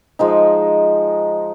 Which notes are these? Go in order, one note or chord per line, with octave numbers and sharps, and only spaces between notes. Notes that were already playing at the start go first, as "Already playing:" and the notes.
F3 G#3 D#4